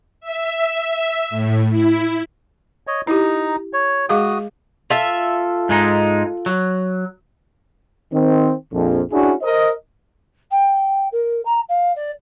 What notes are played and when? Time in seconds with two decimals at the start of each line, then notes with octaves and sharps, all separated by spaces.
0.21 E5
1.30 A2
1.70 E4
2.87 C#5 D#5
3.07 D#4 E4 G4 A#5
3.73 C#5
4.09 G#3 F#4 G#4 F5 D#6
4.90 F4 A4 E5
5.69 G#2 G#3 D#4
6.46 F#3
8.12 D#3 C4
8.72 A#1 F2
9.11 C#4 D4 E4 F#4 G#4
9.42 A#4 C5 D#5
10.51 G5
11.12 A#4
11.45 A#5
11.69 F5
11.95 D5